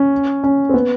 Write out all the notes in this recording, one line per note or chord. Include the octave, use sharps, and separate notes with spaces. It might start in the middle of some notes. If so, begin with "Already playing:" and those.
Already playing: C#4
C#4
C4
B3